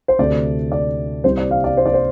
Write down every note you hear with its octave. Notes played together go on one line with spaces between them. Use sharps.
C5
D2 C3 A3 D5
D5
C2 C3 G3 C5
D5
F5
D5
C5
D5
C5